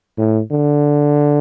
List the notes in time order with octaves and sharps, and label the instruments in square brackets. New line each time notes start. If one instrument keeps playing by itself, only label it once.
[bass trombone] A2
D3